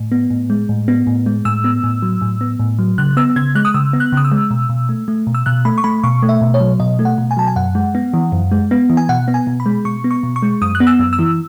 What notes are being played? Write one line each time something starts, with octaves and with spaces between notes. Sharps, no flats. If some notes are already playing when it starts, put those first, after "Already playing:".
Already playing: A2
B3
A2
G#3
A2
B3
A2
G#3
A2 E6
B3
A2
F#3
A2
B3
A2
F#3
C#3 F#6
B3 E6
C#3 G#6
G#3 F#6
D#6
C#3 E6
B3
F#6
C#3 D#6
E6
G#3
B2
B2
A3
A3
B2
E6
B2 F#6
A3 B5
C#6
A3 B5
B2 C#6
A3
E5
B2
C#5
F#3
B2 D#5
A3
F#5
B2
G#5
F#3 A5
G#5
F#2 F#5
G#3
B3
E3
F#2
G#3
B3
E3
G#5
B2 F#5
B3
G#5
B2
B5
G#3
B2 C#6
B3
C#6
B2
C#6
G#3
F#2 D#6
F#6
B3
E6
F#2
E6
E3